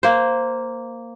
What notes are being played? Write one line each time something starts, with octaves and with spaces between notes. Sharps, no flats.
A#3 C5